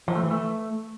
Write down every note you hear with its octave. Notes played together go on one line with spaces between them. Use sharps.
F3
A3
E3
A3